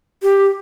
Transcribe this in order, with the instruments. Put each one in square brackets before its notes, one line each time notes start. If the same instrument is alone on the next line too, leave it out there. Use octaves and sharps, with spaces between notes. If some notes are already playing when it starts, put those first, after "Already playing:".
[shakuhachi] G4